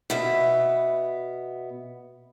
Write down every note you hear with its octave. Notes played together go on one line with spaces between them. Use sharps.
B2 B3 E5